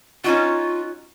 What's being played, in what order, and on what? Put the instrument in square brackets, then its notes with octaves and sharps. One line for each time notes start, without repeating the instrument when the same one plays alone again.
[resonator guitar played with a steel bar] C#4 D#4 F#4 [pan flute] F4